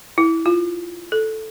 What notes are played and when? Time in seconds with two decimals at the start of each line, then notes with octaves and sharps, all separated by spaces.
0.18 E4
0.46 F4
1.12 A4